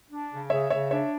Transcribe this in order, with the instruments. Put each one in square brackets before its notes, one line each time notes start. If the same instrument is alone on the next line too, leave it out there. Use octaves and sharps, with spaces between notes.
[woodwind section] D4
C#3
[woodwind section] C#3 [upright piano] C#5 E5
[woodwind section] C#3 [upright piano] C#5 E5
[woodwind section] D4 [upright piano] C#5 E5